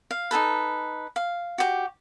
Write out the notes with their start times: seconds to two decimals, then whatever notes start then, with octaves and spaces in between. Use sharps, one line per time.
0.11 F5
0.31 D#4 G#4 A4 B4
1.16 F5
1.58 F#4 G4